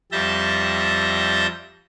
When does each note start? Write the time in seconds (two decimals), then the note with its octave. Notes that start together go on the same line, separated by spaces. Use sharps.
0.12 F2 G3 E5 A5 G6 A#6